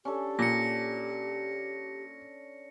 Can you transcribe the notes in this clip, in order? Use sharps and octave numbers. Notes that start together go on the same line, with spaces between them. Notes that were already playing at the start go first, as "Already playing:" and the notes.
C#4 D4 G4 A4
A#2 A#6 C#7